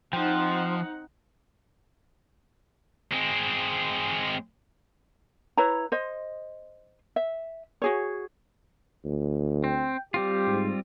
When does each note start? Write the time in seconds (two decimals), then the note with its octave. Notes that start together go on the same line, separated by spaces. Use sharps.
0.13 F3 C4 D#4 C5 F#5 G5
3.13 G#3 C4
5.57 E4 B4 C#5 A#5
5.92 C5 D#5
7.16 E5
7.82 F#4 G#4 C#5
9.05 D2
9.64 C4 G5
10.14 G3 C4 F4 G4
10.47 G#2